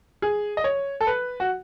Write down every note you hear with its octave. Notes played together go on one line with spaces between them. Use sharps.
G#4
D#5
C#5
A4
B4
F#4